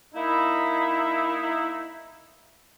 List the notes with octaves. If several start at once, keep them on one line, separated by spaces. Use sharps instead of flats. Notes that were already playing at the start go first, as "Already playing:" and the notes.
A#3 D#4 E4